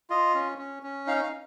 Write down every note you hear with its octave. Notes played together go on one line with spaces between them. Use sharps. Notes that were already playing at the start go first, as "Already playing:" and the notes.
F4 D#5
C#4
C#4
C#4
D#4 F5
F5